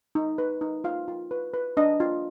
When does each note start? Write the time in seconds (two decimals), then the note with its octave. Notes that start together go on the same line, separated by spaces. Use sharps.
0.15 D#4
0.38 B4
0.61 D#4
0.84 F4 F5
1.08 F4
1.31 B4
1.54 B4
1.77 D4 D#5
2.00 F4